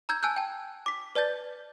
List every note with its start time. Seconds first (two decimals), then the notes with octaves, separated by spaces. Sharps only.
0.09 A#5 E6 G6 G#6
0.23 G#5 A5 E6 F#6 G6
0.36 G5 A5
0.86 D6 B6
1.15 B4 D5 A5 G6 A6